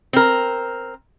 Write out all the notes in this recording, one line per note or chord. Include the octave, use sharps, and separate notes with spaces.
C4 A#4